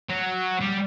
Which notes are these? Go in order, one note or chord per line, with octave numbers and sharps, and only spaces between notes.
F#3
G3